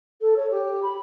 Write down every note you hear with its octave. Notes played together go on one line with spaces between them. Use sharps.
A4
C#5
G4
B5